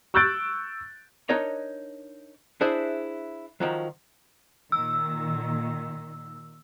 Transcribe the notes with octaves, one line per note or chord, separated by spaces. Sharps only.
C#6 E6 F#6 G6 A6 D7
D4 D#4 A#4 C#5 D#5
D4 E4 G#4 C5 E5
D#3 F3 F#3
A#2 D#3 E6